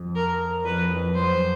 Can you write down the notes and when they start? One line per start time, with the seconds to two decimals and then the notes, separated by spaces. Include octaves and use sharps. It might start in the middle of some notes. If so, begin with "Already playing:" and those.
Already playing: F2
0.15 A#4
0.64 F2 B4
0.90 F2
1.14 F#2 C5